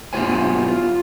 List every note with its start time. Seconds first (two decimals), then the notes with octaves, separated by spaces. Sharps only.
0.13 B1 G2 B3 F4 C5 G#5
0.68 F4